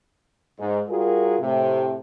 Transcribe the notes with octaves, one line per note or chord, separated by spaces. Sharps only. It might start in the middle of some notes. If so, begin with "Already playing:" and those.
G#2
G3 F4 F#4 G#4 A#4
A2 C3